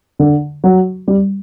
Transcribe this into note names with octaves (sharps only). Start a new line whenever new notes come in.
D3
F#3
G3